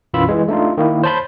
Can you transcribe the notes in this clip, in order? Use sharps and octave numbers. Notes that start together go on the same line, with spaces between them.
B1 F#2 E3 F4 B5 E6
E3 G#3
A3 D4 D#4 F4
D#3 A#3 E4
C5 C#5 A5 B5 G6